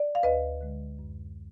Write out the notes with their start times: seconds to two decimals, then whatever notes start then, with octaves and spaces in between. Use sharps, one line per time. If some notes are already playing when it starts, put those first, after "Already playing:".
Already playing: D5
0.15 F5
0.23 D2 B4 D#5
0.61 D3 G#3
0.99 F#2